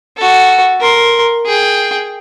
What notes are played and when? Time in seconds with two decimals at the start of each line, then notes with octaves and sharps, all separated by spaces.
0.17 F#4 A4
0.81 A#4 C6
1.46 G#4 G5